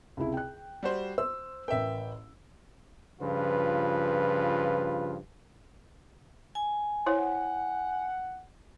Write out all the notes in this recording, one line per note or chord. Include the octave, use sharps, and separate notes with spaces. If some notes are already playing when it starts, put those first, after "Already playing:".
C#2 C3 E4
G5 F#6
G3 F#4 C5
C5 E6
A1 A#4 B4 E5 G5
G2 C#3 F3 F4 B4
G#5
E4 C5 C#5 F#5